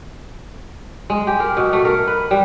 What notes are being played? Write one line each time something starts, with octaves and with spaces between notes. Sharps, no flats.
G#3
G4
A#4
B2
A3
A#4
B4
G3